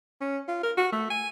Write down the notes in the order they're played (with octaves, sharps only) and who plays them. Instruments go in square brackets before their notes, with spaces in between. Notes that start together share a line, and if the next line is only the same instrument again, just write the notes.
[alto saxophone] C#4
F4
A#4
F#4
A3
G#5